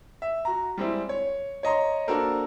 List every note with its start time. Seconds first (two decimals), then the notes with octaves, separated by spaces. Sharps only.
0.22 E5
0.45 F#4 A#5
0.78 G3 G#3 C4 E4
1.09 C#5
1.63 C#5 D#5 A#5 C6
2.08 A#3 D4 F#4 A4 A#4 C5